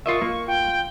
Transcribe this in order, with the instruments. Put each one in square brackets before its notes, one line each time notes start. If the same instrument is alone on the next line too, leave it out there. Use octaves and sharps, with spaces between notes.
[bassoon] A#2 [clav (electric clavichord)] F4 D#5 E5 [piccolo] C#6
[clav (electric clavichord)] A#3 [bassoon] F4
[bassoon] F4 [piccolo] G5